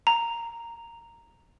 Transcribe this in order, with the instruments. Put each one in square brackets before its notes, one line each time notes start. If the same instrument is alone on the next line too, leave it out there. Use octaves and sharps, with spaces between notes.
[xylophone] A#5